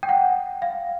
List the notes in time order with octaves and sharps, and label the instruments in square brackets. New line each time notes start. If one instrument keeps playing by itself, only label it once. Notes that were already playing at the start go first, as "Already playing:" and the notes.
[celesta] G5
F#5
F5